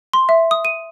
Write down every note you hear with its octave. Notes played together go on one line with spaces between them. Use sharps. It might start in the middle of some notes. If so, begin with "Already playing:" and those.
C6
E5
D#6
D#7